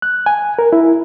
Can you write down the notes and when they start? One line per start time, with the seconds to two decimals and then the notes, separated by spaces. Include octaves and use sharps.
0.02 F#6
0.26 G#5
0.59 A#4
0.73 E4